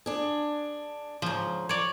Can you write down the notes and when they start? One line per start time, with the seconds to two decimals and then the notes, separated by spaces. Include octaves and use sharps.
0.06 D4 G#4
1.22 G#2 C#3 F3
1.69 C#5 D5